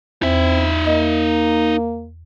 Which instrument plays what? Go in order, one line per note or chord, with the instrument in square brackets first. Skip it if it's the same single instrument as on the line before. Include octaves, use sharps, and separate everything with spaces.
[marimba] E2 [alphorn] C4 [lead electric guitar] D#4 E5
[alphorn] A#3 [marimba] D#5